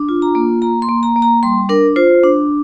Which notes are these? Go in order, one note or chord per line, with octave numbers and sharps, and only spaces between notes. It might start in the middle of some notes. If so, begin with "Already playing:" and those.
Already playing: D4
F4
A#5
A#3
A#3 A#5
C6
A#3
A#5
A#3
A#5
G3 C6
D4 A#4
F4 C5
D4